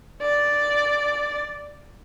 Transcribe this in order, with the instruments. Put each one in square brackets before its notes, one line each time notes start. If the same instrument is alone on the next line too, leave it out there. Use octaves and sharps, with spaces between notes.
[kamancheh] D5